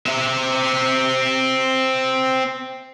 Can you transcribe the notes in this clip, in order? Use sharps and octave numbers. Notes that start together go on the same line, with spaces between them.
C4 E5